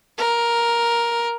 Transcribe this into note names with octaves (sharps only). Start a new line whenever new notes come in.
A#4